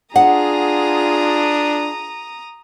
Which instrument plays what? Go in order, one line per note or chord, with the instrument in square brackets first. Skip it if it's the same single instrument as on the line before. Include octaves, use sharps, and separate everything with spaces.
[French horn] D4 [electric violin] F4 G#4 [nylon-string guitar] F#5 [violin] A#5 D#6